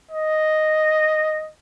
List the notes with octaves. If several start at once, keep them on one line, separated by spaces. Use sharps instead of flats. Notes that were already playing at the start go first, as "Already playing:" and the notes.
D#5